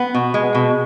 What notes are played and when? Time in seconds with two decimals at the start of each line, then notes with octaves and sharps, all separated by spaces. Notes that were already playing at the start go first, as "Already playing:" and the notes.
Already playing: B3
0.14 B2
0.34 G#3
0.54 B2